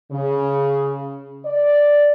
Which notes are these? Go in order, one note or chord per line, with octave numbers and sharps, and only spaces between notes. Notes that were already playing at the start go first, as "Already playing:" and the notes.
C#3
D5